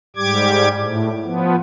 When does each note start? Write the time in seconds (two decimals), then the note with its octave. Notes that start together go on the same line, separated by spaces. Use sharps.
0.16 G#2 G3 G4 D6 G#6
0.76 A2
1.24 F3 B3